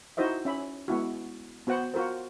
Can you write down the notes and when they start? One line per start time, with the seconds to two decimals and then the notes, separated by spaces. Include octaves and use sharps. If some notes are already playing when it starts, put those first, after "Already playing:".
0.17 D#4 E4 F#4 C5 D#5 E5
0.45 C#4 E5 B5
0.88 G#3 B3 E4 F#4
1.67 B3 F#4 C5 F#5
1.94 F4 F#4 A#4 C5